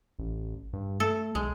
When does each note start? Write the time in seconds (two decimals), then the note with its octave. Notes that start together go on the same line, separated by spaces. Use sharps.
0.19 A1
0.73 G2
1.00 A3 A4
1.35 B1 G#3